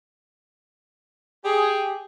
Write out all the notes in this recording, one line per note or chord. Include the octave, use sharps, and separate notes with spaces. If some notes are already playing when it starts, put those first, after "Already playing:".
G4 G#4